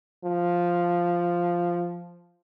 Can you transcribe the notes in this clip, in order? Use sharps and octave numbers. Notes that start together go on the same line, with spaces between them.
F3